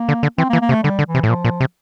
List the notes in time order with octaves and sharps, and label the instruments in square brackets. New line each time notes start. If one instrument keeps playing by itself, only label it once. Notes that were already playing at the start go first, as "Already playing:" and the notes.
Already playing: [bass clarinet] A#3
[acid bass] D3
D3
[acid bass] E3 [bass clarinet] C4
[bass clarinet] A#3
[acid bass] E3
[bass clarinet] A#3
[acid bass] C3
[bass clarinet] A3
[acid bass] D3 [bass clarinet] G3
[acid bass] D3
[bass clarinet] E3
[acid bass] C3
A2
[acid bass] A#2 [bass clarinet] F3
[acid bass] A#2
C3